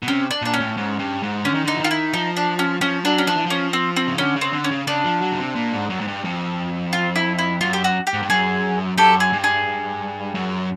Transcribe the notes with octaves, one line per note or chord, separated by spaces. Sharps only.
B2
C3 C#4
D4
A#2 D4
C#4
A2
G#2
G2
G#2
D3 C#4
D#3
D3 D#4
E3
D#3 F4
E4
F3 D#4
D4
C#4
F3 C#4
F#3 D4
C#4
F3 D4
E3
F3 C#4
C4
C4
C#3
D3 C#4
C#3
C4
D3
C#4
C#3
C#3 D4
F3
F#3
C#3
C3
A#2
G#2
F#2
G#2
G2
F2
F4
E4
E4
F#2 F4
G4
F#4
G4
G#2
G2
F#2 G#4
F#2 G4 A4
G#4
G2
G#4
F#2